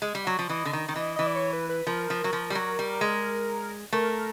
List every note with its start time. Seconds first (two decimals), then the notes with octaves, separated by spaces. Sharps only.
0.02 G#3
0.15 G3
0.27 F#3
0.39 F3
0.49 E3 D#5
0.65 D3
0.73 D#3
0.89 D#3
0.96 E3
1.16 E3 D#5
1.26 D5
1.36 C#5
1.53 B4
1.69 B4
1.87 F3 A#4
2.10 F3
2.24 F#3
2.33 F3
2.50 G3
2.55 F#3
2.79 G3
3.01 G#3
3.93 A3 A#4